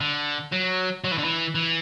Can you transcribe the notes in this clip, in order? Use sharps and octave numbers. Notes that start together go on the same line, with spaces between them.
D3
F#3
F#3
E3
D3
E3
E3